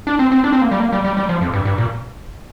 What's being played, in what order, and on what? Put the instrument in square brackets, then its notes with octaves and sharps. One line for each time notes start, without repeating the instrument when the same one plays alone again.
[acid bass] D4
C4
C4
D4
C4
A#3
G3
A#3
G3
G3
G3
F3
F2
G2
G2
A#2